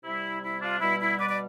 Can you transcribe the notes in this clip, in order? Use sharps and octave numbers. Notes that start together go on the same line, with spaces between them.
C3 G3 E4
E4
D4 F4
B2 G3 E4
E4
B4 D5
B4 D5